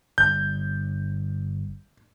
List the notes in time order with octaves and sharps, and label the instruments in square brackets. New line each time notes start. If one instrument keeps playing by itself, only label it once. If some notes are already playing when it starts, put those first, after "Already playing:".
[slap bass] G1 [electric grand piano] G6